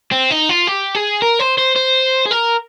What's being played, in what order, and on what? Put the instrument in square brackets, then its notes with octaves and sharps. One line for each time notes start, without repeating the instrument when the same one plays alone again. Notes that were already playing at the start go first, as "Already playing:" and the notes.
[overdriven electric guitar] C4
D#4
F4
G4
G#4
A#4
C5
C5
C5
G#4
A#4